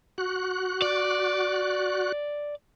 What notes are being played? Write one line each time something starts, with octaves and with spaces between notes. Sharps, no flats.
F#4 F#6
D5